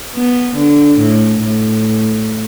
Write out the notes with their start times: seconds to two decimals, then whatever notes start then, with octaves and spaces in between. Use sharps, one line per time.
0.15 B3
0.56 D3
0.98 A2
1.41 A2